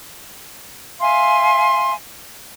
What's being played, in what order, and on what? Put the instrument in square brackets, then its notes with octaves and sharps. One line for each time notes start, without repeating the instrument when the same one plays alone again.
[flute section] E5 F5 G#5 C6